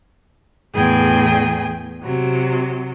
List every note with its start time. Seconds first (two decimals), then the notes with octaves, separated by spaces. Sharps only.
0.75 E2 A2 G#4 G5 G#5
2.03 C3 F#3